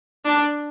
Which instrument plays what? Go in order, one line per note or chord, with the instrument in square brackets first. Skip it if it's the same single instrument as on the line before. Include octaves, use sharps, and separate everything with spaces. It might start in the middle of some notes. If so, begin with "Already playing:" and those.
[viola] D4